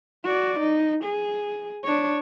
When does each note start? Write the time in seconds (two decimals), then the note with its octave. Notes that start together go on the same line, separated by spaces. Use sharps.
0.24 F#4 D5
0.60 D#4
1.04 G#4
1.84 D4 C#5